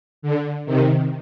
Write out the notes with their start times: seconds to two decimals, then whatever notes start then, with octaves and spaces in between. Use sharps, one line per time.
0.22 D3
0.66 C3 D#3